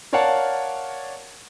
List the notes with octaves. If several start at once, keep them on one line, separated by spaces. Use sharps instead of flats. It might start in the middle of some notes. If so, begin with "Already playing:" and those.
A#4 C#5 D5 F5 F#5 A5